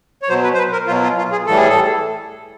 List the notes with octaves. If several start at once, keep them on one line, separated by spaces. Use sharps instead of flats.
C#5
B2 F#3 C5
B4
C5
B4
A#4
B2 F#3 F4
F4
F4
G#4
A2 E3 G3 A4
G#4
A4